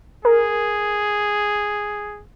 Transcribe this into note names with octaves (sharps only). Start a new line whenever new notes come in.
G#4 A#4